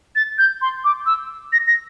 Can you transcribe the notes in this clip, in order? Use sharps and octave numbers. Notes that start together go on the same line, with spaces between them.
A6
G6
C6
D6
E6
A#6
A#6